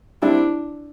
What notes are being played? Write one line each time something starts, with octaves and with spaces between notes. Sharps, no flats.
G3 C4 D4 E4